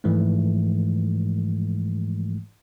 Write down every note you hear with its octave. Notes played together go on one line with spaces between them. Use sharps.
G#2 E3 F3 G#3 A3